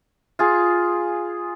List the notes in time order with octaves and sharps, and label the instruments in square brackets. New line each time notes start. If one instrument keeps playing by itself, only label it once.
[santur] F4 G#4